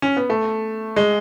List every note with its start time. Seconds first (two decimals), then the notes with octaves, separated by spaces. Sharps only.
0.02 C#4
0.17 B3
0.30 A3
0.96 G#3